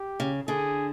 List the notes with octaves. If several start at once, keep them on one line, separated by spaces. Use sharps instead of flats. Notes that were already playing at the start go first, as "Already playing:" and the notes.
Already playing: G4
C#3
D3 G#4